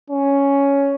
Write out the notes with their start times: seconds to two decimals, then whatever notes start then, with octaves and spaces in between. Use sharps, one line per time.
0.10 C#4